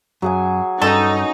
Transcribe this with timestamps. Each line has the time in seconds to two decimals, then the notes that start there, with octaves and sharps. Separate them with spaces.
0.22 F#2 F#3 G#4 G#5
0.82 G2 C#4 D#4 A4